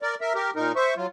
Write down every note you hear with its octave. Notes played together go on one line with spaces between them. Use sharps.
A#4 D5
A#4 E5
G4 A#4
A#2 D#4 A#4
C5 E5 C#6
F#3 F4